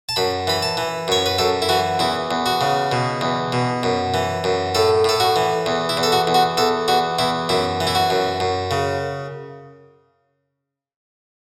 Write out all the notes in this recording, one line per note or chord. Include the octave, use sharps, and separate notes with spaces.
A5
F#2 B5
E3 B5
A5
E3
F#2 C#5
B4
F#2 A4
E4
E3 F#4
E2 E4
E2
F#4
C#3
B2
E2
B2
F#2
E3
F#2
A2 A4
A2 A4
F#4
E3
E2
E4
E2
A4
F#4
E2
F#4
E2 A4
E2 F#4
E2 E4
F#2 E4
E3
E4
F#4
F#2
F#2
C#3